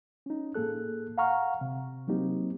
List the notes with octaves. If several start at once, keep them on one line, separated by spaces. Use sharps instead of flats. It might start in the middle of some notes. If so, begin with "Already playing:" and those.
C#4 D#4
A2 A#3 G#4 A4 F#6
F5 F#5 A#5 C#6 F6
C3
F#3 A#3 C4 D#4 G4